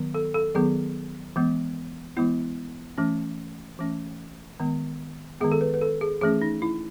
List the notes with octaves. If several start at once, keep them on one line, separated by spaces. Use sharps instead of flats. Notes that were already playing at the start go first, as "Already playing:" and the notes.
Already playing: D#3 F#3 B3
A4
A4
D#3 F#3 B3 G#4
E3 G#3 B3
E3 G#3 B3 E4
E3 A3 C#4
E3 A3 C#4
D#3 G#3 B3
D#3 G#3 B3 G#4
A4
B4
B4
A4
G#4
E3 A3 C#4 G#4
D#4
E4